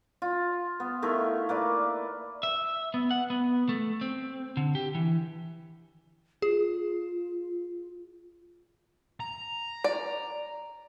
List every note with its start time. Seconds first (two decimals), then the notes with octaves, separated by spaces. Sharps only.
0.22 F4
0.80 B3
1.02 D#3 A3 E4 A#4
1.49 A#3 B4 D5
2.43 E5
2.94 B3
3.11 F#5
3.30 B3
3.69 A3
4.01 C4
4.57 D3
4.75 G4
4.95 E3
6.42 F4 G#4
9.20 A#5
9.84 D5